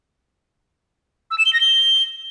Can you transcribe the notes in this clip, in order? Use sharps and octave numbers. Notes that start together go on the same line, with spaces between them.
E6
E7
G7
A#6
G7